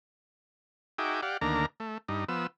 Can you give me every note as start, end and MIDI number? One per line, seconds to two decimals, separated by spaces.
0.98 1.21 63
0.98 1.21 66
0.98 1.21 68
0.98 1.21 76
0.98 1.21 79
0.98 1.21 86
1.23 1.37 67
1.23 1.37 74
1.23 1.37 77
1.23 1.37 78
1.41 1.66 38
1.41 1.66 51
1.41 1.66 58
1.41 1.66 62
1.41 1.66 82
1.80 1.98 57
2.08 2.25 43
2.08 2.25 63
2.29 2.47 53
2.29 2.47 59
2.29 2.47 88